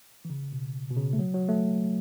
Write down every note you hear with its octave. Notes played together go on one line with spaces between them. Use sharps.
E3
C#3
B2
B2
C#3
A3
F#3
F#3
A3